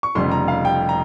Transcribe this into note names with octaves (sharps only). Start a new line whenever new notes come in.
C#6
F1 F2 C#3 G3 C6
A#5
F5
G5
A#5